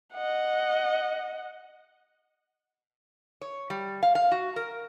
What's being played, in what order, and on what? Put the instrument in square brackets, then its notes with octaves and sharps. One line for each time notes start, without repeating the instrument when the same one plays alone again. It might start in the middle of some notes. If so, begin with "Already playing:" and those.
[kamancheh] D#5 F#5
[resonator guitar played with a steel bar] C#5
G3
F5
F5
F#4
A#4